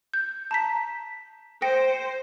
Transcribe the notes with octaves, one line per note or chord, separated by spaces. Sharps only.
G6
A5 A#5 B6
C5 G5 A#6 C#7